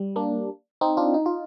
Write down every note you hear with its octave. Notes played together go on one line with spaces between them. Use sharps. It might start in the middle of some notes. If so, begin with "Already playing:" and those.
Already playing: G3
A#3 D4
C4 D#4
D4 F4
D#4
F4